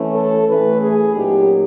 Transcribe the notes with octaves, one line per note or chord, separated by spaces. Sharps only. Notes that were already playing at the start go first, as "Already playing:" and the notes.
Already playing: E3 A3 C#4
A4
A2 E3 A3 C#4 B4
G#4
A#2 F#3 B3 D#4 G4